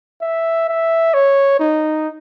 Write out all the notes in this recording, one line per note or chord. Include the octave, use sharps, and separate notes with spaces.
E5
E5
C#5
D#4